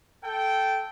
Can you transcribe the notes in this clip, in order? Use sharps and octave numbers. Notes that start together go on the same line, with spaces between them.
A4 G5